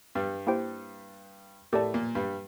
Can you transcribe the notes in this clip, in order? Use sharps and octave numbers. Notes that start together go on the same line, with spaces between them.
G2 G3
A#3 E4 G4 C5 G5
A2 A3 G4 A#4 D5 A5
A#2 A#3
G2 G3